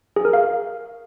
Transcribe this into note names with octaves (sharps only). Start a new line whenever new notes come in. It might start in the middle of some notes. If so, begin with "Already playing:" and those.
G#4
A#4
F5